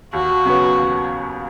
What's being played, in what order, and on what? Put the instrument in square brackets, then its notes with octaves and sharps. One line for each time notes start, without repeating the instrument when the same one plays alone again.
[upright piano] D#2 [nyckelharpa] F#4
[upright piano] C#3 F#3 B3
D#2